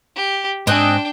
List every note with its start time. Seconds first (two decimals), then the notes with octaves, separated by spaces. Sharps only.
0.16 G4
0.67 G#2 C4 D4 D#5 G5 G#5 F#6